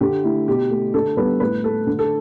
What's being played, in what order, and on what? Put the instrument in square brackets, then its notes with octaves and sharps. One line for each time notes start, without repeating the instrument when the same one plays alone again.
[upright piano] D3 G4
A3 E4
B2 G4
A3
D3 A4
G3 B3 B4
A2 B4
A3 A4
D3
A4